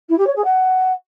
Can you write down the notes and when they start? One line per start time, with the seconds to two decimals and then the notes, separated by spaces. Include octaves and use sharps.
0.09 E4
0.18 G4
0.26 C#5
0.35 G#4
0.44 F#5